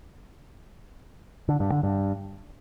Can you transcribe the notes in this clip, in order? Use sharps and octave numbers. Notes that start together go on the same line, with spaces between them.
D3
G2
D3
G2